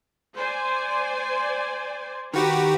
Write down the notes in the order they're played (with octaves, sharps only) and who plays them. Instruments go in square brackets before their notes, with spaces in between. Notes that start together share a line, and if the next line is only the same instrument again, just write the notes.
[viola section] C5 D5 G#5
[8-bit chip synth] D#3 F#4 G4 [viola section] B4